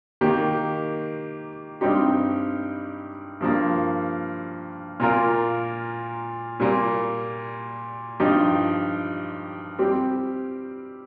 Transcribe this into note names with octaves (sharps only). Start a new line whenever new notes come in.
D#3 A#3 G4
G2 G3 C4 D#4 G4
G2 F3 A#3
A#2 A#3 F4 A#4
A#2 G3 A#3
G2 F3 D#4 G4
G3 C4 G4